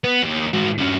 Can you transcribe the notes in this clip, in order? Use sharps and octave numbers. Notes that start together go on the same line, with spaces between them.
B3
D#2
G#2 F#4
G2 C#4